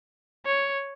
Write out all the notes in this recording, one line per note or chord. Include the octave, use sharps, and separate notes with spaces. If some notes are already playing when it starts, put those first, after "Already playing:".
C#5